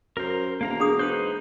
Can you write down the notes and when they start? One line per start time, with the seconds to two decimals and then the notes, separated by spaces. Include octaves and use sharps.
0.17 F#2 A#4 C5
0.61 E1 A#3 F5 A#5
0.80 D4 G#4 D#6
0.99 D#4 B4 C5